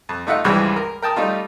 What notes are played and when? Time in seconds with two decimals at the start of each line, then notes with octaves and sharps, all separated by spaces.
0.09 F2
0.27 A3 D#4 F4 E5 F#5
0.44 C#2 G2 E3 F3 G3 G#3
0.76 A#4
1.02 A#4 G5 A5 D#6
1.16 G3 A3 D#4 F4